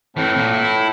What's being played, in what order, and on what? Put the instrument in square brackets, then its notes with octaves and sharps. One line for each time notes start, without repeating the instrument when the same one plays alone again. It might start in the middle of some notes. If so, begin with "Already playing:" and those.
[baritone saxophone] A2 [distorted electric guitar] E3 C4
[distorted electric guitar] A#2
E4